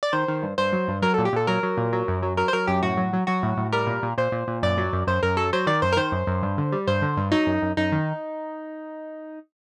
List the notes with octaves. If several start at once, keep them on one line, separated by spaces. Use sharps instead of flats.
D5
D#3 C5
D#3
G2
G2 C5
F#3
G2
F#3 A#4
A#2 A4
G4
A#2 A4
F#3 A#4
F#3
A#2
F#3
F#2
F#3
F#3 A#4
C5
F#3 A#4
F#2 G4
A2 F#4
F#3
F#3
F#3 F#4
A2
A2
G3 A#4
A#2
A#2
A#2 C5
A#2
A#2
F#2 D5
F#3
F#2
F#2 C5
F#2 A#4
F#3 A4
F#3 C5
D#3 D5
F#2 C5
A#4
D#3 C5
F#2
F#2
G2
D3
G3
G2 C5
D3
G2
F#3 D#4
F#2
F#2
F#2 D#4
D#3